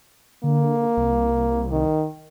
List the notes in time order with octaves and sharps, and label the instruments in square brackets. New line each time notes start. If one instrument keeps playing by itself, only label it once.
[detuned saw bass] D3 [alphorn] A#3
[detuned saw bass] C2
[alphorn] D#3